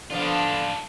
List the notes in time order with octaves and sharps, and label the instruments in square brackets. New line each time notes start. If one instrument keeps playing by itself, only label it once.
[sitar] D3 F3 B3 [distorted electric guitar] D4 F4